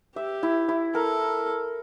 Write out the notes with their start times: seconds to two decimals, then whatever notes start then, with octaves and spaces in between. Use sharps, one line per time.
0.16 G4 E5
0.43 E4
0.69 E4
0.94 A4 A#4